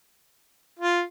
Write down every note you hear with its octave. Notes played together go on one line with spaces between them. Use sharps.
F4